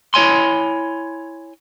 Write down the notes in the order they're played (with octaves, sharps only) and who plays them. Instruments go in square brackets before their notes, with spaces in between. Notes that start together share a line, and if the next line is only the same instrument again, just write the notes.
[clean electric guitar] E4 C#5 G#5 C6